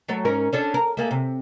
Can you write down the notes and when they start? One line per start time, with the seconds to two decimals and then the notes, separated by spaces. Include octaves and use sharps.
0.09 F#3 A3 C#5
0.25 G#2 C#4 A#4
0.53 C#4 D4 A4
0.74 A#4
0.97 A3 A#3 G#4
1.11 C3